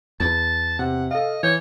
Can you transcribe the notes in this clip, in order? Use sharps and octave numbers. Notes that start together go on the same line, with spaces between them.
E2 A5
C3 F#5
A4 D#5 F5
E3 C#5 G6